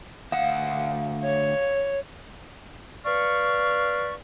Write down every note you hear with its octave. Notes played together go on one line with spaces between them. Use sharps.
D2 F5 F#5
C#5
B4 D5 F5 C#6